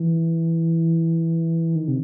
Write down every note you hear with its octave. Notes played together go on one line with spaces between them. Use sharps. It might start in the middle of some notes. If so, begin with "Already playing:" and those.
Already playing: E3
D#3
C3